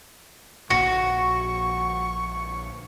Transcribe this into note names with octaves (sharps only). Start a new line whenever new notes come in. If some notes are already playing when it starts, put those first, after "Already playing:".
A#1 A#2 D3 F#4 C#6